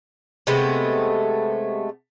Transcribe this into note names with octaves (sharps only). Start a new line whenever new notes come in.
C3 G#3 A3 B3